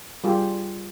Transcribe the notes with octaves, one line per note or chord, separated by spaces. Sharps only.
G3 F4 G4 G#4